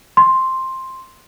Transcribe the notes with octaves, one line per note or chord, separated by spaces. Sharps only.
C6